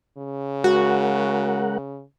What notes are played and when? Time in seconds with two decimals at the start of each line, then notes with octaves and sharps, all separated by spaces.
0.17 C#3
0.64 G#3 F#4 A#4 F#5